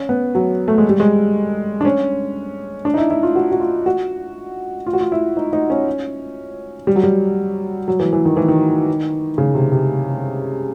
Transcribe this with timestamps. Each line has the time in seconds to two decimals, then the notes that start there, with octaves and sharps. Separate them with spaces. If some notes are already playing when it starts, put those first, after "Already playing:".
Already playing: C#4
0.09 B3
0.35 F#3
0.68 A3
0.78 G#3
0.89 G3
1.00 G#3
1.81 D4
1.85 C#4
2.85 D4
2.94 D#4
2.98 E4
3.10 E4
3.23 F4
3.35 F#4
3.52 F#4
3.60 F4
3.86 F#4
4.87 F4
4.93 F#4
5.01 F4
5.12 E4
5.37 D#4
5.53 D#4
5.70 C#4
6.87 G3
6.96 F#3
7.03 G3
7.88 F#3
8.00 E3
8.13 E3
8.25 D#3
8.37 E3
8.48 D#3
9.38 C#3
9.55 C3
9.72 C3